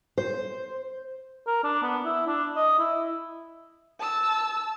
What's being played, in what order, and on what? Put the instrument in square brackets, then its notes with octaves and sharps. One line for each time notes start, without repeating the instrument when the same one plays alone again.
[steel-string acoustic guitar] C5
[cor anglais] A#4
D4
B3
E4
D4
D#5
E4
[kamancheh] A5 E6